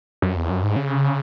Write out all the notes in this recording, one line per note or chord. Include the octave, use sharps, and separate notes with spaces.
F#2
E2
F#2
G#2
C#3